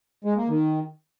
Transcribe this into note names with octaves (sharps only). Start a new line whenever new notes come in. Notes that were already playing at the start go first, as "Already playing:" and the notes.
G#3
A#3
D#3